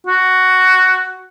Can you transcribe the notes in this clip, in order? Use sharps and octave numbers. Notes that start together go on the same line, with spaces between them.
F#4